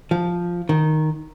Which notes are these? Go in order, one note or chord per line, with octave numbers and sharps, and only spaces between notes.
F3
D#3